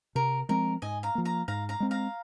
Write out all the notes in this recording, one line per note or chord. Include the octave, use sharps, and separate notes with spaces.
C3 A#4
F3 G#3 C4 A#4
G#2 D#5 G#5
F5 A#5
F3 A#3
F5 A#5
G#2 F5 A#5
F5 A#5
G#3 C4
F5 A#5